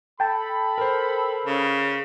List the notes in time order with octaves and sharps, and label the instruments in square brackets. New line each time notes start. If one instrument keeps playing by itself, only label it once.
[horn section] A4 B5 [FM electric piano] G5 A5
[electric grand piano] A#4 C5
[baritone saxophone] C#3